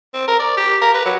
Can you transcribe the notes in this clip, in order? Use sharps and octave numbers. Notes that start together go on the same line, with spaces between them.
C4
A#4
D5
G4
A#4
B4
F#3